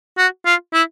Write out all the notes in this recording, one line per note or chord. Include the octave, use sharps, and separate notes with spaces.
F#4
F4
E4